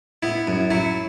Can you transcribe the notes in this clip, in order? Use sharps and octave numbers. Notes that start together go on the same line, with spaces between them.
B3 E4
F#2
F#3 E4